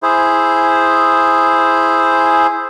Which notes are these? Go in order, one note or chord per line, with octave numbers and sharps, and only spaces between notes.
E4 G#4 C5